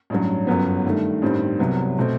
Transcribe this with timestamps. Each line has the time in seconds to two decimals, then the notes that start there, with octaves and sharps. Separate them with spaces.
0.10 A1 G2 F#3
0.47 G1 F#2 F#3 B3
0.85 G2 D#3 A3
1.22 A1 G2 D#3 G3 C4
1.59 C2 C3 F#3 B3
1.98 B2 A3 C4